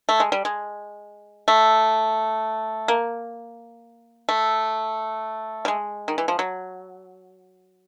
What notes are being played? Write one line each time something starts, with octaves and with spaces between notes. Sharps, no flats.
A3
G#3
G3
G#3
A3
A#3
A3
G3
G#3
D#3
E3
F3
F#3